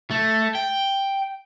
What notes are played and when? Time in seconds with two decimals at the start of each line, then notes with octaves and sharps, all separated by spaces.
0.11 A3
0.55 G5